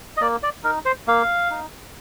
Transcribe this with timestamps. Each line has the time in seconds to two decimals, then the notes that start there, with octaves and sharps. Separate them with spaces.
0.17 D#5
0.21 A#3 D5
0.43 D5
0.64 D#4 A#4
0.85 C5
1.08 A#3 F5
1.51 D#4